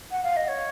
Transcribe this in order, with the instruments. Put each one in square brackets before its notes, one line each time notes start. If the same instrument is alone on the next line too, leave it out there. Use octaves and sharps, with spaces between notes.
[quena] F#5
F5
D#5
C#5